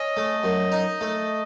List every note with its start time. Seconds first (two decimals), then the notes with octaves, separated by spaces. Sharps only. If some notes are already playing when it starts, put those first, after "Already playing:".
Already playing: C#4 D#5
0.17 A3
0.44 F#2
0.72 D#4
1.01 A3